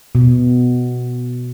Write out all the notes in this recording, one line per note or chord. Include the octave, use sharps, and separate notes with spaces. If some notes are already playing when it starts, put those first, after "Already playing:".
B2